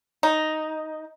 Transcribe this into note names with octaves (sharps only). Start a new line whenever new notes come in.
D#4